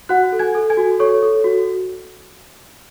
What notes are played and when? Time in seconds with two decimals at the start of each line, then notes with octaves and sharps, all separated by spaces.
0.09 F#4 F#5 F#6
0.32 A4
0.39 G#5 G#6
0.55 A4
0.70 G#5 G#6
0.77 F#4
0.99 A4 C#5 C#6
1.22 A4
1.44 F#4